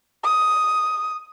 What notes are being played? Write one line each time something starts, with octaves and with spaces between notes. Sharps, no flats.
D#6